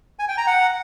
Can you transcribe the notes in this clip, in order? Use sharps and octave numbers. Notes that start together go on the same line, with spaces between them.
G#5
G5
A#5
F#5